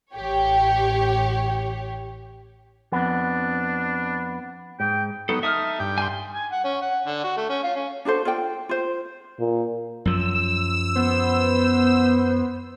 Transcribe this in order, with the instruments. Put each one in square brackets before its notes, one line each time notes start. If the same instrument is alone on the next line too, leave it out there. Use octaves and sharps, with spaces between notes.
[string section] A1 G4 C#5
[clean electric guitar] F2 B3 [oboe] D4
[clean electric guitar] G#2 [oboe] G5
[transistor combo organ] F#3 B3 D#4 [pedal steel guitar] A4
[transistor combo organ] D#4 A4 [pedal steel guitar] E5 D#6 F6
[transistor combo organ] G2 G5
[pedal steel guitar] G#5 C6
[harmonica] G#5
F#5
C#4
F#5
D3
F#4
A3
C#4
F4
C#4
[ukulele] D4 F#4 A4 C5
F4 A4 D5 G5
F4 C5
[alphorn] A#2
[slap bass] F#2 F3 [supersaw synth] E6
[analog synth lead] B3 [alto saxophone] C5